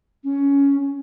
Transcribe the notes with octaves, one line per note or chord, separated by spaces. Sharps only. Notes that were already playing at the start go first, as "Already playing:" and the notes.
C#4